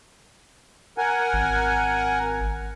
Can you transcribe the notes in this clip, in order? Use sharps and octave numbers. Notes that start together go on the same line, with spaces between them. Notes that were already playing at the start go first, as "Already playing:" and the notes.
A#4 F#5 G#5
G#1